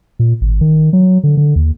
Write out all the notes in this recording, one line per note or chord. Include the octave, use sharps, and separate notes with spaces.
A#2
G#1
D#3
F#3
D3
D3
D#2